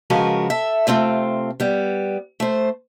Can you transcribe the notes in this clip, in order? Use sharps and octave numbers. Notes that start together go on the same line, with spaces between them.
C#3 F3 G#3 F#4 A#4 B4
A4 E5
C3 A3 C4 F4
G3 B3
A3 C5